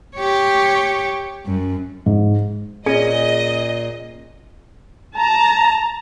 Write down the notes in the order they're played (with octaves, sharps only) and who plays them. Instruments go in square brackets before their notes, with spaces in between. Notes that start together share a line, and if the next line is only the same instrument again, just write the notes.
[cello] G4 C#5
F#2
[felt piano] G#2
[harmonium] A#2 [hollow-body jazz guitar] C#4 [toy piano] G#4 [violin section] D#5
[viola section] A5 A#5